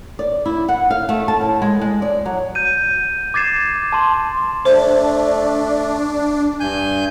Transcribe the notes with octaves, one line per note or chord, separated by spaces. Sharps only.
D5
E4
F#5
F5
A3
A5
A2
G#3
G#3
D5
F#3
G6 D#7
D6 G#6 A6 C7 E7
A5 C6
A3 D4 C5
G2 G#5 G6